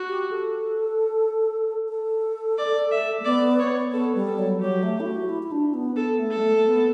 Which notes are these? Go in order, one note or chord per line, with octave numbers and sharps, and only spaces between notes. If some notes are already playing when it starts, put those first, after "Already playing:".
Already playing: F#4
G4
A4
A4
D5
E5
A3
B3 D5
C#5
B3 A4
G3
A4
F#3
F#3 G4
A3
E4
F#4
E4
E4
D4
B3
B3 A4
A3
A4
G3
A3
A3
B3